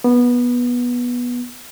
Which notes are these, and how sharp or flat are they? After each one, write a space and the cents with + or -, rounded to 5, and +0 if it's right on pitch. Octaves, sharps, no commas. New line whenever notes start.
B3 -15